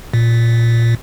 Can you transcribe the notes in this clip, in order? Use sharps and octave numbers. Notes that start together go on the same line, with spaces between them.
A#2